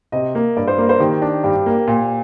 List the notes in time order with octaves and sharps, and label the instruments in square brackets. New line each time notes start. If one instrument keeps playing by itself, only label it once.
[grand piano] C3 [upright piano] D#5
[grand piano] A#3
[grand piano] G2 [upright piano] D5
[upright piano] C5
[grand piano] A#3 [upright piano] A#4
[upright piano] C5
[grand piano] D#3 [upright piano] G4
[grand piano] D4
[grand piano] G2 [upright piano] G4
[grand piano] A#3
A#2